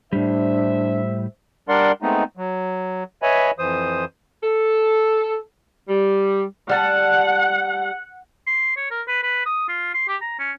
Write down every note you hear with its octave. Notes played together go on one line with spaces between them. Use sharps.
A2 G3 D4 C5 E5
G3 D4 A#4 D5 F#5 C6
G#3 A3 B3 C4 D#4
F#3
B4 C#5 D#5 E5 G#5 B5
F2 E3 C5 D#6
A4
G3
G3 F#5 A5
C6
C#5
A#4
B4
B4
D#6
F4
C6
G4
A#5
C#4